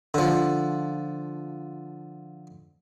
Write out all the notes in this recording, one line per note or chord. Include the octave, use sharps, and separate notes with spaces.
D3 F3